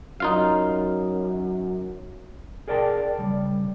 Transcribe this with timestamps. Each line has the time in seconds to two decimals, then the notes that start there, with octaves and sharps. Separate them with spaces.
0.20 F#2 D#4 F4 F5
2.68 G#4 A#4 D5 G5 A5
3.18 C#3 G3